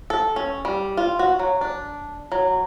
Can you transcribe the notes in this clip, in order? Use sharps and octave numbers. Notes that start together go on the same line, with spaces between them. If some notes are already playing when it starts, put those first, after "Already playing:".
A4
C#4
G3
F4
F#4
F#3
D4
F#3